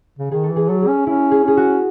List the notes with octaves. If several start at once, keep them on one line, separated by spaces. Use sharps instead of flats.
C#3
D#3 G#4
A4
E3
G#4
F#3 A4
G#4
C#4
C#4 E4
G#4
C#4 G#4
F#4